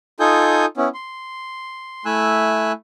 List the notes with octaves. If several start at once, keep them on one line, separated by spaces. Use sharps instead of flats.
D#4 F4 A4 G#5 D#6 G6
B3 C#4 E4
C6
A3 E4 G#5 E6 F#6